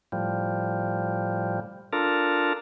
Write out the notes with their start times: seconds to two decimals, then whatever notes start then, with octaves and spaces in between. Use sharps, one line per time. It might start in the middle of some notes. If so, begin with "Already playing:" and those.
0.12 A2 F3 G3
1.93 D4 F4 A4 A#4